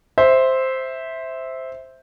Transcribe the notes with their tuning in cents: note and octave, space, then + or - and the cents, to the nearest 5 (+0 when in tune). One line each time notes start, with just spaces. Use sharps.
C5 +0 E5 -10